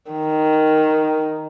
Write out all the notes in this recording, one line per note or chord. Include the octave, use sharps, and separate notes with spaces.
D#3